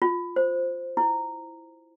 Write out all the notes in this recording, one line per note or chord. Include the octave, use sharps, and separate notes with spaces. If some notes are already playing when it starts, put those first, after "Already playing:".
F4
C5
E4